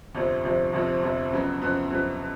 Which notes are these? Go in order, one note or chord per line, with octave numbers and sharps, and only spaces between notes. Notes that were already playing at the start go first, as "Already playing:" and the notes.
G1 F2 C3 F3
G1 F2 C3 F3
G1 F2 C3 F3
G1 F2 C3 F3
F2 C#3 F#3 B3
F2 C#3 F#3 B3
F2 C#3 F#3 B3
B3